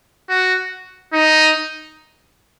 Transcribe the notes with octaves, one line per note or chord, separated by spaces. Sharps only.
F#4
D#4